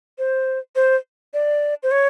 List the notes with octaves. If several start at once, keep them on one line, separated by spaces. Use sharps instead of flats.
C5
C5
D5
C5
C#5